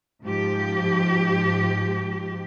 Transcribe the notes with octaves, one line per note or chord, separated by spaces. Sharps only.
G#2 F3 G4